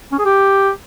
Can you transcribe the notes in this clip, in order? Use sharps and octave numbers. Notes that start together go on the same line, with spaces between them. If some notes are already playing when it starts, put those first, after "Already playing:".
C#4
G#4
G4